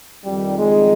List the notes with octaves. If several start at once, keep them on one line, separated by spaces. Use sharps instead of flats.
F2 D#3 G3
G#3